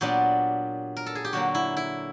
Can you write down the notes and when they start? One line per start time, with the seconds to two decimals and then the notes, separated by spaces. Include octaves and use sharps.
0.01 A#2 F#3 B3 D4 G4
0.97 A#4
1.06 A4
1.15 G#4
1.25 G4
1.33 D3 F#3 A#3 F#4
1.55 E4
1.77 E4